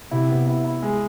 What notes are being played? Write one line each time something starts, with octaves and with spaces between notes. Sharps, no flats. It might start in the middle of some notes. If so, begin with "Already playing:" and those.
C3 E4
B3
E4
E4
G#3